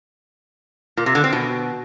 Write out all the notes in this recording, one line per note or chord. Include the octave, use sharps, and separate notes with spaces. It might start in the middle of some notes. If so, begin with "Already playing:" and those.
A#2
C3
D3
C4
B2